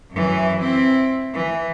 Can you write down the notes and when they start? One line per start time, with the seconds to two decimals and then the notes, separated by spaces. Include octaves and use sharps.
0.11 F#2 E3
0.61 C4 E4
1.33 E3